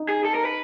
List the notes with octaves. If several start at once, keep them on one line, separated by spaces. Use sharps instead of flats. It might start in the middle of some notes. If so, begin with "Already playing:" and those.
Already playing: D#4
G#4
A4
A#4
B4